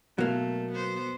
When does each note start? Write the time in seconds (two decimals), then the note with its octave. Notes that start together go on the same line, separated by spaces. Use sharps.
0.18 B2 F#3 A3 A#3
0.72 B3 C5